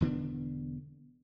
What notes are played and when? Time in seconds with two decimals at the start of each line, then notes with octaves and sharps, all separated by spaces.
0.01 E1 D3 B3 D4